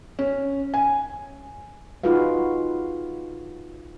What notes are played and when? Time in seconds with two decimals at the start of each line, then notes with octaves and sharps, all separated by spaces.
0.19 C#4
0.74 G#5
2.04 D#4 F4 F#4 G#4 B4 F5